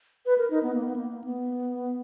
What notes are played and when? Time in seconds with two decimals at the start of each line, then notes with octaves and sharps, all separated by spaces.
0.26 B4
0.38 A#4
0.50 D#4
0.63 B3
0.74 A#3
0.85 B3
0.96 A#3
1.24 B3